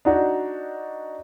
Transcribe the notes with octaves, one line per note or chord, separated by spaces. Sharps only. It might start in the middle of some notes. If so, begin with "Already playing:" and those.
D4 D#4 F#4